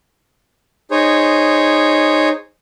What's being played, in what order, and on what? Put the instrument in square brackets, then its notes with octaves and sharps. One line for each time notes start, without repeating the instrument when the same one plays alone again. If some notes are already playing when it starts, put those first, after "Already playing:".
[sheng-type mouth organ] D#4 G#4 C5 C#5